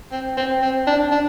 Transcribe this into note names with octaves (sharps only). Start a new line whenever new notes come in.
C4
C4
C4
D4
D4